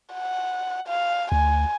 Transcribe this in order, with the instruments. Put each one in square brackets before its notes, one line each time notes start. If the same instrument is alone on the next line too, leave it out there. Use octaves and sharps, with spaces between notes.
[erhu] F#5
F5
[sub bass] D2 [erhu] G#5